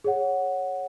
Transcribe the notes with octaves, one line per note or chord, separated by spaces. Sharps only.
G#4 C#5 F#5